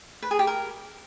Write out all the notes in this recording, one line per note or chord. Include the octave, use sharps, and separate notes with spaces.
B4
G#4
G4
A#4